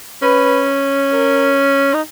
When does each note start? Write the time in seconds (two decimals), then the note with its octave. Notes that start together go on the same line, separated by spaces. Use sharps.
0.22 C#4 B4
1.12 A#4
1.94 D#4